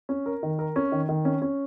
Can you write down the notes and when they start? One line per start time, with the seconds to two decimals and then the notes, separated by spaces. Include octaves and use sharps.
0.09 C#4
0.26 A#4
0.43 D#3
0.59 A#4
0.76 C#4
0.92 D#3
1.09 D#3
1.25 C#4
1.42 C#4